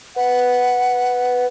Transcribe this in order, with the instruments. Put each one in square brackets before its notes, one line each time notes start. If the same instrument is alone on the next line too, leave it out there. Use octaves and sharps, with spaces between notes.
[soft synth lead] B4 [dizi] F#5